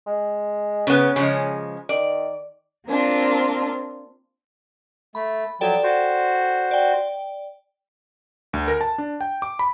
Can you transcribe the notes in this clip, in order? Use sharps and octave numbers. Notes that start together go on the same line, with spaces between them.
G#3
C#3 B3 C#4
C#3 F3 G#3
D#3 D5
A#3 C4 D4 F4
A3 B5
F3 F#3 A4 D5 G5
F#4 C5
D5 G5
D2
A#4
A5
D4
G5
D6
B5